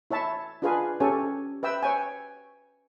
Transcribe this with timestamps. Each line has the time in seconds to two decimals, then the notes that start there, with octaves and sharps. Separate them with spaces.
0.11 E4 C#5 E5 A5
0.62 D4 F4 G#4 B4 F5 G#5
1.00 C#4 G4 A4 C#5 G#5
1.63 B4 E5 G5 E6
1.83 C#5 G5 G#5